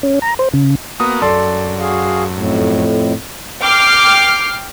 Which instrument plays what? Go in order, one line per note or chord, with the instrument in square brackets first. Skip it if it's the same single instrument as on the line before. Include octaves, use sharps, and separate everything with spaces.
[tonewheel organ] C#4
A#5
C5
C#3
[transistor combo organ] A#3 B3 F#4 [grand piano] D#6
[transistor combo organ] F#2 [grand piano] A4 D5 C6
[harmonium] F#4 G#4 F5
F2 A2
[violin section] G5 D6 F6 C7